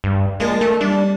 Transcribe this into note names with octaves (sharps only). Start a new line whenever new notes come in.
G2
G#3 A#3 D4 F4
A3 D#4
G3 D4